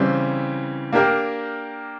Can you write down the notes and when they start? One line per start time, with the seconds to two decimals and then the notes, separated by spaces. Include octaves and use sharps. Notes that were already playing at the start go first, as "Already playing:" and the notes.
Already playing: C#3 E3 G3 C4 E4
0.93 A#3 D4 G4 A#4